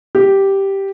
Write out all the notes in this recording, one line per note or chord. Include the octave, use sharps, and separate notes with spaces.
G4